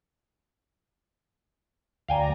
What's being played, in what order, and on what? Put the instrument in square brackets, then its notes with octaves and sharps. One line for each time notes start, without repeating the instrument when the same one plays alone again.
[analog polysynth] D2 D5 A#5 [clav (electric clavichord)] F5 G5 G#5